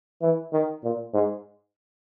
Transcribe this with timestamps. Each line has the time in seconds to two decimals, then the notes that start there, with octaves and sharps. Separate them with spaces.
0.22 E3
0.53 D#3
0.84 A#2
1.14 G#2